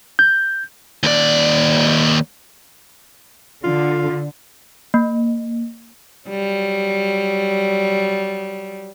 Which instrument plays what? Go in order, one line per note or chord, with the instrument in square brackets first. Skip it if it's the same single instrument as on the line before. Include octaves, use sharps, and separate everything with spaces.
[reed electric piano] G6
[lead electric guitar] D#2 D5
[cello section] D3 [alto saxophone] F4
[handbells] A#3
[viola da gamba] F#3 G3